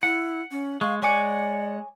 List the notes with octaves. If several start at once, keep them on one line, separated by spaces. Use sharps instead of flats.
E4 F#5
C#4
G#3 F5 C#6
G#3 C#5 D5 F#5 G#5 D6